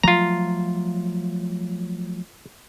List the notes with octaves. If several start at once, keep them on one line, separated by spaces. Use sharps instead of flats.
F3 F#3 A3 F4 A#5